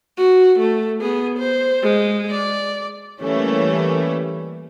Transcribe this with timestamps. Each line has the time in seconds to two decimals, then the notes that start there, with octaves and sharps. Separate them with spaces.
0.18 F#4
0.60 A3
1.01 B3 G#4
1.38 C5
1.83 G#3
2.31 D5
3.21 E3 G3 A3 A#3 C#4